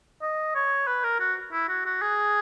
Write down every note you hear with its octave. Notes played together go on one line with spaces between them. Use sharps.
D#5
C#5
B4
A#4
F#4
E4
F#4
F#4
G#4